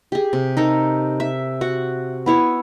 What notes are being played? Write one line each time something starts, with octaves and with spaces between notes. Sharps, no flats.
G4 G#4
C3
D#4 A4 A#4
E5
F#4 F#5
B3 E4 C#5